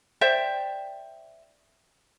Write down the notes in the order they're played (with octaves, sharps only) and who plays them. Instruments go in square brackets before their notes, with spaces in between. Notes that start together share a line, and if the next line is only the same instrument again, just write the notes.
[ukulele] C5 D5 E5 G5